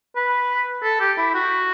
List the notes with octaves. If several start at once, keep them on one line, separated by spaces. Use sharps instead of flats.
B4
A4
G4
E4
F#4